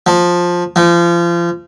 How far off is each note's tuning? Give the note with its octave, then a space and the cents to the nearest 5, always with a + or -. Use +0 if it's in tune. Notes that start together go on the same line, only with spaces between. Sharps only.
F3 +10
F3 -30